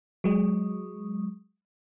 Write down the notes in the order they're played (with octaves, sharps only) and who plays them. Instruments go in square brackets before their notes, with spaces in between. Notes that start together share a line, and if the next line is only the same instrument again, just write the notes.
[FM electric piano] F#3 G#3